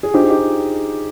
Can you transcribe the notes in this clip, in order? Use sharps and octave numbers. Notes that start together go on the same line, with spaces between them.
G#4
D4 D#4 F4 G4 C5
G#4
D#4 G4